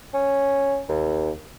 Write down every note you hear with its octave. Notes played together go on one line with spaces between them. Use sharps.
C#4
D#2